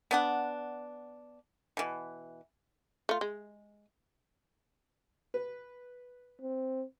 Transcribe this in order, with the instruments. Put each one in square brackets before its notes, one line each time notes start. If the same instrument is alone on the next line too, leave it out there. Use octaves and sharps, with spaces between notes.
[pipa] B3 D4 F#5
B2 E3
[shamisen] A3 F4
G#3
[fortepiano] B4
[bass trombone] C4